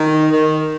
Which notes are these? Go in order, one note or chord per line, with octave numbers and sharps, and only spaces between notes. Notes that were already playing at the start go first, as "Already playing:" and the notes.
Already playing: D#3
D#3